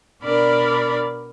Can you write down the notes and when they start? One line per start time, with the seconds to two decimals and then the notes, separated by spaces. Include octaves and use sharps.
0.23 B2 D4 A#4 D5 B5